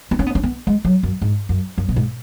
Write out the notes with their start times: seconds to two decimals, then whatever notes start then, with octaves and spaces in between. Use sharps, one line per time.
0.11 B3
0.19 C#4
0.26 B3
0.35 C#4
0.43 B3
0.67 G#3
0.85 F#3
1.03 F#2
1.22 G#2
1.49 F#2
1.78 F#2
1.89 B2
1.96 G#2